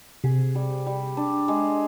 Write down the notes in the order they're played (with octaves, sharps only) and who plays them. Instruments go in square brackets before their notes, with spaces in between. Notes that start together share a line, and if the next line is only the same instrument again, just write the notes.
[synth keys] C3 [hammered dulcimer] G#4
[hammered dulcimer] G3
G3
D4
G#3